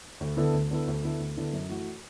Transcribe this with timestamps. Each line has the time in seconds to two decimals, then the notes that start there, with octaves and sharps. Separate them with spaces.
0.21 D2
0.37 D3 B3 E4 A4
0.53 D2
0.70 D3 B3 E4 A4
0.87 D2
1.03 D3 B3 E4 A4
1.20 D2
1.37 D3 B3 E4 A4
1.53 F#2
1.69 E3 A3 F#4